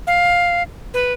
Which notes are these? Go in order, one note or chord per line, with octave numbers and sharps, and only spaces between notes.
F5
B4